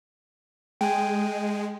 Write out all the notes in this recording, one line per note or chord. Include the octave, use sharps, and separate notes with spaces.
G#3 G5 G#5